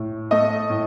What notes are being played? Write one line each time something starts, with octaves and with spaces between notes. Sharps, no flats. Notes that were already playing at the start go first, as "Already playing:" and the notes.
Already playing: A2
A3 D#5
A2